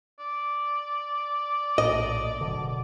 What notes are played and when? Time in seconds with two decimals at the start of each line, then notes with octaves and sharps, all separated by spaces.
0.19 D5
1.78 A#1 A2 D#5
2.41 F#1 B2 D3